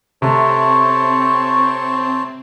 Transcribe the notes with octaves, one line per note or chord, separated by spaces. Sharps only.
C3 A3 C4 C5 C#5 A5 C#6